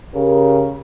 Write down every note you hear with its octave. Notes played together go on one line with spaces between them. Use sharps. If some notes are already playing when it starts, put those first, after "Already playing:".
C#3 G4 A#4